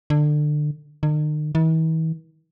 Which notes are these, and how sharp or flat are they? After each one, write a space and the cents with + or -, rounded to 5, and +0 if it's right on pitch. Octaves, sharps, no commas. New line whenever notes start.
D3 +25
D#3 -45
E3 -45